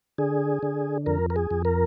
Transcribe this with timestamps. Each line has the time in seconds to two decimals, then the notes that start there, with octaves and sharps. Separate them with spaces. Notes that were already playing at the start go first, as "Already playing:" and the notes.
0.18 D3 G#4
0.63 D3
1.06 F2 A#4
1.30 A#4
1.36 G#4
1.51 F2
1.65 A#4